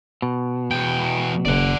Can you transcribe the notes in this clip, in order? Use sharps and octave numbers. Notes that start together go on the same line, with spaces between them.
B2
E2 G5
F#1 D5 F#5